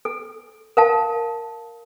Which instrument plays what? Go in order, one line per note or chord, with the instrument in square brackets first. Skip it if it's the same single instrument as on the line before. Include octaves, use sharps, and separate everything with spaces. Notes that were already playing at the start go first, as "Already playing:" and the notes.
[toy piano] A4
A#4 F5 A5